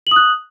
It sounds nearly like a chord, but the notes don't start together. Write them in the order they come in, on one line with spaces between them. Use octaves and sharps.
F#7 D#6 F#6